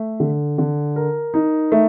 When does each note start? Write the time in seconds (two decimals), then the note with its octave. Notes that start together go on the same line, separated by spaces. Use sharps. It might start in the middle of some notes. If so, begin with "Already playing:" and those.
Already playing: A3
0.20 D3
0.58 D3
0.96 A#4
1.34 D#4
1.72 A3